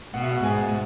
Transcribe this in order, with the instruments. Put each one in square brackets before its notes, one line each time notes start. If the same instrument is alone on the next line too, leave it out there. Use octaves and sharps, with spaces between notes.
[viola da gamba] B2 [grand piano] F#5
[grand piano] E5
F#5
[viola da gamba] G#2 [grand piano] G#5